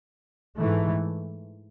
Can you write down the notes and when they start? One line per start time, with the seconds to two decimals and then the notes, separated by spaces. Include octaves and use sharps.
0.57 G#2 E3 A3